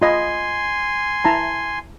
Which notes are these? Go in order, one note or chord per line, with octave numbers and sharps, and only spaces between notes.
F4 D#5 G#5 B5 C6
E4 A5 A#5